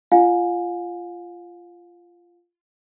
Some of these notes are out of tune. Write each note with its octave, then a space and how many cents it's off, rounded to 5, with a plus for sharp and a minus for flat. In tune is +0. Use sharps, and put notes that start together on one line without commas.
F4 -15 F5 +35 G#5 +5